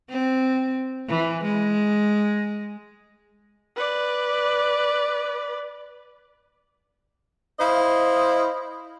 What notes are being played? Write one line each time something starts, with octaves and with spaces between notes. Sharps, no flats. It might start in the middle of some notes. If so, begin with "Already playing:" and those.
C4
E3
G#3
B4 D5
E4 C5 D#5 F5